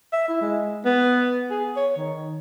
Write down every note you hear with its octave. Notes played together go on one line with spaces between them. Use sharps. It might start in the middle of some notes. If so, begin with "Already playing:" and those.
E5
E4
G#3
B3
G#4
C#5
D#3